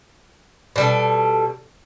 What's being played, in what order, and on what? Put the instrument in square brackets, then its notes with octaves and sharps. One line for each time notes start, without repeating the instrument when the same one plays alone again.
[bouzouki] B2 G3 A4